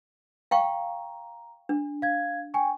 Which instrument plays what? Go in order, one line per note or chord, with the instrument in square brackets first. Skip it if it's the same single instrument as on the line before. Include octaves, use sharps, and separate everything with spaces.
[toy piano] F5 G5 C#6 [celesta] A#5
[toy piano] D4
[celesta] F5 G#6
G5 G#5 C#6